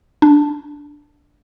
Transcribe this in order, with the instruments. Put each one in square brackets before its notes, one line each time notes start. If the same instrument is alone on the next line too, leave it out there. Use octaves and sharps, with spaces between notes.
[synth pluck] D4